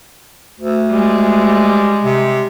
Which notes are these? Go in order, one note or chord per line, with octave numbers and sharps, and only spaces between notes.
D2
G3 G#3
C3